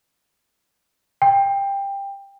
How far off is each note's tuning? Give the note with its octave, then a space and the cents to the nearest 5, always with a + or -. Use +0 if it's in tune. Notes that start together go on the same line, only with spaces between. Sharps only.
G5 +15